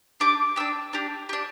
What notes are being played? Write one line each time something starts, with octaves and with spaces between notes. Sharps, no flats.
D4 G4 D6
D4 G4 E6
D4 G4
D4 G4